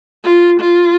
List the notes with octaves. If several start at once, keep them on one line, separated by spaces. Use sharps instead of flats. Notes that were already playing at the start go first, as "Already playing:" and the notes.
F4
F4